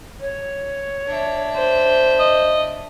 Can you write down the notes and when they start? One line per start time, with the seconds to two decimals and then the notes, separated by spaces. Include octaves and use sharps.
0.21 C#5
1.07 D4 E5
1.56 C5
2.19 D#5